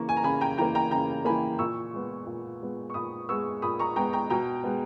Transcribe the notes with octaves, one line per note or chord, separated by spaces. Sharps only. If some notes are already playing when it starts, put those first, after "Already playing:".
Already playing: C#3 E3 A#3 C#6
G#5
A#5
C#3 G#5 B5
G5 A#5
E3 A#3 G5 A#5
G5 A#5
C#3 G5 A#5
E3 A#3 G#5 B5
A#2 C#6 E6
G#3 B3
A#2
G#3 B3
C#6
A#2 B5 D#6
G#3 B3 C#6 E6
A#2 B5 D#6
A#5 C#6
G#3 B3 G5 A#5
G5 A#5
B2 G5 A#5
G#3 B3